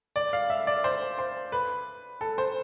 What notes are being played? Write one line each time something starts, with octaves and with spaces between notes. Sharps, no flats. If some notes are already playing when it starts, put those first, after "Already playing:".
D5
F5
E5
D5
C5
C5
B4
A4
C5